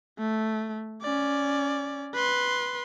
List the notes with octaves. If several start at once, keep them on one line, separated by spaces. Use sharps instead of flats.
A3
C#4 D5
B4 C6